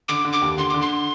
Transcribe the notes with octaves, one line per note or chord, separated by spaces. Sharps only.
D3 D6
D3
D6
D#2
D3 C6
D3 D6
C6